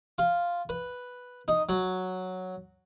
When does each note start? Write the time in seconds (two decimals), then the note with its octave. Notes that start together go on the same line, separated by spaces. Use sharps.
0.18 F4
0.69 B4
1.48 D#4
1.69 F#3